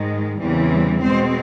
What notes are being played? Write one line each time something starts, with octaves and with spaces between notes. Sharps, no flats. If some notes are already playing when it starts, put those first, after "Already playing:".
Already playing: G#2 D#3 G#3
E2 C#3 E3 G3 C4
B2 G#3 C4 C5